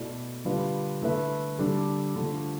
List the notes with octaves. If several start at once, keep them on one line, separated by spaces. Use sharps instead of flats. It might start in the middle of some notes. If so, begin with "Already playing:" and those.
Already playing: B2 A3 E4 A4 D5
D3 G3 D4 F4 B4
D3 A3 E4 B4 E5
D3 G3 D4 A4
D3 F3 A3